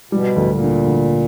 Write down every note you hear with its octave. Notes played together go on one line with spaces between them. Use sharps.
B2 G3
D2
A2
A#2
D3
D2